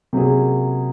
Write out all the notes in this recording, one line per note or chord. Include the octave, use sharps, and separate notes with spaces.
C3 F#3 A#3 C#4 G#4